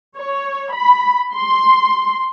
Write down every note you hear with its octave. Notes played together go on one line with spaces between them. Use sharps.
C#5
B5
C6